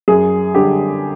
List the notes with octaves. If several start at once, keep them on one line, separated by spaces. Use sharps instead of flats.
F#2 G#4
D3 G3 G4